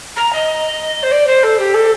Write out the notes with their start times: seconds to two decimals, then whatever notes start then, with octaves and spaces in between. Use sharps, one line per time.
0.16 A#5
0.32 D#5
1.02 C5
1.11 D5
1.26 C5
1.43 A4
1.58 G4
1.74 A4